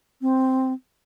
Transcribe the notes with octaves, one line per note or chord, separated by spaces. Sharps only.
C4